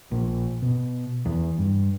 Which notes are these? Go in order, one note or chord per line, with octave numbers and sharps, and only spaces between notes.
A#1
B2
E2
G2